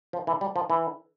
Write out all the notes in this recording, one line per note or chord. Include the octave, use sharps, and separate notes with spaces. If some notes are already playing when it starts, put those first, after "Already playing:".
F3
E3
G3
F3
E3